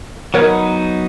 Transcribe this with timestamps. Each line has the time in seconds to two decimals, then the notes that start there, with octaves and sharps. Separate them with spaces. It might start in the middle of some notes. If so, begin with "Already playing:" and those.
0.34 F#3 B3 D#4 A#4 C#5